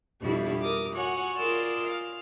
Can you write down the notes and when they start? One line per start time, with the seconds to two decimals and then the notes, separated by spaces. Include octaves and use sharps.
0.21 F2 B2 G3 D4 E4
0.62 A#4 D6 D#6
0.94 F#4 C#5 F#5 G#5
1.38 F4 G#4 A#4 D5 C6 E6
1.86 F5